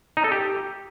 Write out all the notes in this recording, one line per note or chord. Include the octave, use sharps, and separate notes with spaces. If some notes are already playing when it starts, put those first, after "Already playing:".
D#4
A4
G4